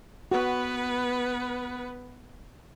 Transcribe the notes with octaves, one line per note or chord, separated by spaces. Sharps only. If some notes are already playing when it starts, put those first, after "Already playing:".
B3 F#4 B4